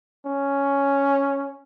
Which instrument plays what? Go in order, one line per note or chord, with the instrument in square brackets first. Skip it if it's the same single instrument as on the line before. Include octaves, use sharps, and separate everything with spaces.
[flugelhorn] C#4